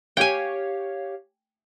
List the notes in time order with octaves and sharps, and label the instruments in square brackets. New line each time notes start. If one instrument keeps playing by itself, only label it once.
[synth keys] G4 C#5 F5 [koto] G5 G#5